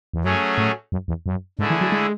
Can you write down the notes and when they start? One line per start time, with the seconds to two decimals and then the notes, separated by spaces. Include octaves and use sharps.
0.13 E2
0.24 F#2 F#3 A3 C#4 G#4
0.58 A2
0.92 F#2
1.08 E2
1.26 F#2
1.59 G#2 D3 A3 E4 G#4
1.70 E3
1.81 F#3
1.92 G#3